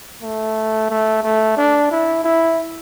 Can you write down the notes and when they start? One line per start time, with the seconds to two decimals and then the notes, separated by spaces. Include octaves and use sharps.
0.22 A3
0.90 A3
1.23 A3
1.57 D4
1.91 E4
2.24 E4